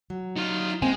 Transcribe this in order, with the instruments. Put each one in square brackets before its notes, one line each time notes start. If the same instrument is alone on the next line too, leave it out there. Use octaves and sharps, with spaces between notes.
[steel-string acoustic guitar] F#3
[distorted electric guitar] D#4 F4
[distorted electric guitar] G#3 [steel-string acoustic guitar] A#3 C4 G#5